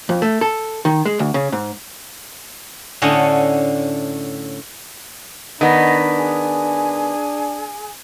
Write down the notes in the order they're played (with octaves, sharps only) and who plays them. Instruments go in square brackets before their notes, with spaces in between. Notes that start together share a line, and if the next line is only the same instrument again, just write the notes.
[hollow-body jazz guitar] F2
A3
A4
D#3
G#3
D2
C#3
G#2
[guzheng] A2 D3 C#4 A4 D#5 F#5
[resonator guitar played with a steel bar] D#3 B3 [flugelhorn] D4 [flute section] D#5 F#5 B5
[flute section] G#4 G#5